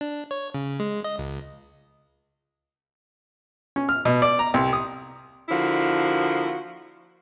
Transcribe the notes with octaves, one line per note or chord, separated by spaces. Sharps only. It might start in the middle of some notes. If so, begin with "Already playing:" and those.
D4
C#5
C#3
G#3
D#5
C#2
C#4
F6
B2
D5
A#5
C2
D#6
D3 F3 A#3 E4 F#4